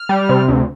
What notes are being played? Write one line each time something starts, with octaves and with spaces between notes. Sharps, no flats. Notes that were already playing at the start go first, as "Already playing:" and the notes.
Already playing: F6
G3
C3
D2